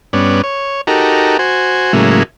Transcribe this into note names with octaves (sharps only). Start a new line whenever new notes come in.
G2 B3 C#4 D5
C#5
D#4 F#4 G4 A4 A#4
F#4 C5 G#5
A2 C#3 F#3 G#3 A#3 E4